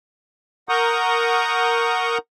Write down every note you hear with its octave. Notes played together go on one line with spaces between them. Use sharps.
A#4 F#5 A#5 C#6 D#6 G6